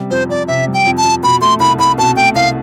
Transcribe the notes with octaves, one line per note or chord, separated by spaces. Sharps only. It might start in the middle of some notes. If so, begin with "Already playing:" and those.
Already playing: C3 G3
F2 C5
F2 D5
C3 E5
G3
G5
F2
A5
F2
B2 B5
A3 C6
C2 B5
C2 B5
B2 A5
A3 G5
C2 F5